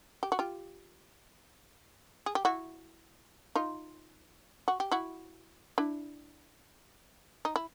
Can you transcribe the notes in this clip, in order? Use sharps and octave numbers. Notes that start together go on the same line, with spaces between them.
G4
F#4
F4 G4
G#4
G4
E4 F#4
D#4 F4
F#4
G4
E4 F#4
D4 E4
D#4
E4